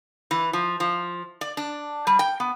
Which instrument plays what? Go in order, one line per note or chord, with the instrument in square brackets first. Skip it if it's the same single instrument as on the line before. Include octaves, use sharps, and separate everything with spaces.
[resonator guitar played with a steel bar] E3
F3
F3
D5
D4
G3
G5
B3